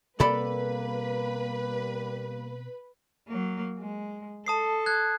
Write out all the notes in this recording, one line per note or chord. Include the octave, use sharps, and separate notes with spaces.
B2 G3 A#3 C4 A4 B4 D5 B5
F#3 A#3
G#3
A4 A5 D#6 C7
F#6 G#6